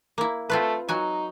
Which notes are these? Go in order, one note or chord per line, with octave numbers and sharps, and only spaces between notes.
A#3 E4
A3 C4 F4 B4
F#3 D#4 F#4 G#5